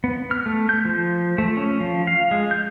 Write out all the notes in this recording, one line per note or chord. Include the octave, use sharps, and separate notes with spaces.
B3
F6
A3
G6
F3
A3
C#4
F3
F5
G#3
G6